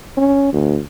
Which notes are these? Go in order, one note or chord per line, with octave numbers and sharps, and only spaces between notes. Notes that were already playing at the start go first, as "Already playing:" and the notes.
C#4
D2